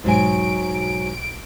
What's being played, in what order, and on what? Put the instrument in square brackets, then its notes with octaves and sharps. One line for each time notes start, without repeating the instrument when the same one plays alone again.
[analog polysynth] B1 D7 [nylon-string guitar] G#2 F#3 G#5